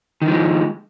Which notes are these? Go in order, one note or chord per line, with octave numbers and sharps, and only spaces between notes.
D#3 F3 G#3